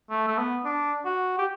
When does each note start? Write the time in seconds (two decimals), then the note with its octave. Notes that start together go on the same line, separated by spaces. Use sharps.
0.10 A3
0.28 A3
0.38 B3
0.65 D4
1.05 F#4
1.38 G4